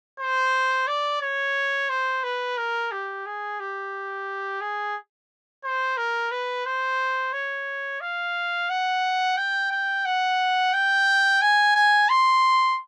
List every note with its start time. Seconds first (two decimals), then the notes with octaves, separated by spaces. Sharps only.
0.19 C5
0.88 D5
1.21 C#5
1.89 C5
2.23 B4
2.57 A#4
2.92 G4
3.26 G#4
3.60 G4
4.61 G#4
5.64 C5
5.97 A#4
6.31 B4
6.66 C5
7.33 C#5
8.01 F5
8.70 F#5
9.37 G5
9.71 G5
10.05 F#5
10.73 G5
11.41 G#5
11.75 G#5
12.09 C6